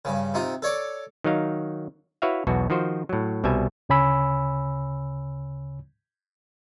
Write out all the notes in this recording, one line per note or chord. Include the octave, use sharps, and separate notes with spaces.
G2 C#3
C3 D#4 F4
A4 C#5 D5
D#3 F#3 D#4 F5
E4 F#4 B4 C#5 E5 F5
B1 E2 B2 F#4
D#3 F3 F#4 C5
A2 F#3
C2 B2 G3 E5 G#5
D2 C#3 C#5 G#5 B5 E6